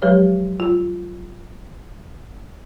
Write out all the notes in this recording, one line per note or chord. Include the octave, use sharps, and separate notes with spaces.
F3 F#3 G#3 G4 B4 C#5
F4